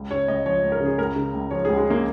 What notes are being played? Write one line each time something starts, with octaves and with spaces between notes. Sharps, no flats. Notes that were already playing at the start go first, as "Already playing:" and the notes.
Already playing: C#2
C#3 C#5
C#2 D#5
F3 C#5
C#2
A#4
C#3
G#4
C#2 A#4
C#3
C#2
F3 C#5
G#4
C#2
G#3
C#3 A#3